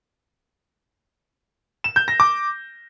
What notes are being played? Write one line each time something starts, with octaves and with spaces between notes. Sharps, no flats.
E7
G6
A#6
D6